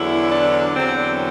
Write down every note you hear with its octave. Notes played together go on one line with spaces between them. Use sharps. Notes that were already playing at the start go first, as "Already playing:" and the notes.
Already playing: E2 D3 F#3 E4
D4
E2 D3 F#3 C4